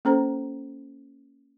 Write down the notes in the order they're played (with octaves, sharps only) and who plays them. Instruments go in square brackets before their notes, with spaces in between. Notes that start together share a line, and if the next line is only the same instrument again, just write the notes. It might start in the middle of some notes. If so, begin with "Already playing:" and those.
[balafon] A#3 C#4 A4 C5 A#5